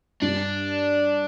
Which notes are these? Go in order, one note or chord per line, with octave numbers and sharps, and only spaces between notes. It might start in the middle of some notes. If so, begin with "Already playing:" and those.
G2 D4